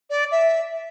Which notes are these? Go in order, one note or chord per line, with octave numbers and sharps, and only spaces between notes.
D5
E5